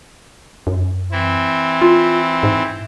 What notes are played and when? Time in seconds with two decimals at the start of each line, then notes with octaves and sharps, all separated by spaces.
0.67 F#2
1.12 E3 C4 E4
1.82 F4
2.43 G#2